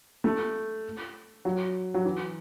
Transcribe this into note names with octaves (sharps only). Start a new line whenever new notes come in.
A3
F#3
F#3
E3